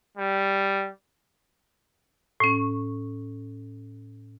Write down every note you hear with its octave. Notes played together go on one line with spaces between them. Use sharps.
G3
A2 C#4